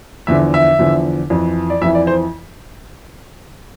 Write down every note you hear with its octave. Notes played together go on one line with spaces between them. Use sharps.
E2 D3 F3 E5
E5
E2 D3 F3
F2 E3
D5
F2 E3 E5
D5
C5